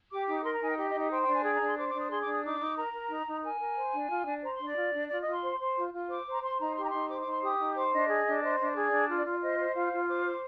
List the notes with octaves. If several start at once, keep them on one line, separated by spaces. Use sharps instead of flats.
G4 D6
D#4 D6
A#4 C6
A#5
D#4 G#5
G5
G4 D#5
D#5
D#4
D#5
C5 G5
G5
D4
G#5
G#4 G5
A#5
D4
C6
C5 D6
D4 D6
D#6
G#4 C6
D6
D4
D#6
D#4 D6
D#4
A#4 A#5
A#4
D#4
D#4
A#4 G#5
A#4
C5
D4
F4
D4
C5 A#5
C6
D4
D5
F4
D4
F4 D5
D#5
F4 C6
C5
C5
F4
F4
C5 D6
C5
A#5
C5 C6
D#4 A#5
G4 C6
A#5
D#4 C6
C5 D6
D6
D#4
C6
G4 D#6
D#4
C5 D6
D4 D#5
G#4
D4
C5
D4
G#4 D5
D4
F4
F4
C5 D#5
C5
F4 F5
F4
C5 D6
C5